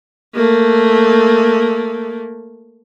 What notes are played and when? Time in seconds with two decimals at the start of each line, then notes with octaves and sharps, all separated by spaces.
0.35 A3 A#3